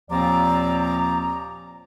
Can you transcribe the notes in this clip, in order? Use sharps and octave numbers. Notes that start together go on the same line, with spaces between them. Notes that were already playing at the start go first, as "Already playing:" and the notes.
D#2 A#2 F3 C4 D5 A#5